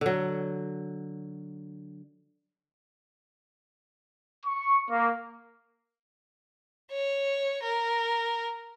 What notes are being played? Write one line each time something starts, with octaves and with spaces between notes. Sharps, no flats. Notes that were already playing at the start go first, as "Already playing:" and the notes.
D3 F#3
C#6
A#3
C#5
A#4